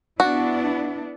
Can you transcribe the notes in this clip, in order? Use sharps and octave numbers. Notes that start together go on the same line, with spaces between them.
B3 D4 E4 F#4